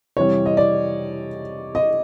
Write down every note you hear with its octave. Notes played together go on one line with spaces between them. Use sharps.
F2 C3 E3 G3 C#5
D#5
D5
D#5